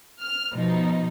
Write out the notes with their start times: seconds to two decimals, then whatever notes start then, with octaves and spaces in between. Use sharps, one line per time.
0.22 F6
0.54 B2 F3 D#4